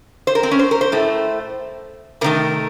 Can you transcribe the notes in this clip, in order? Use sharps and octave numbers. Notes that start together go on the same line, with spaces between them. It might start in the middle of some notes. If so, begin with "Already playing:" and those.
C5
A#4
C4
C#4
C5
A#4
C5
A2 A3
C3 D#3 A3 A#4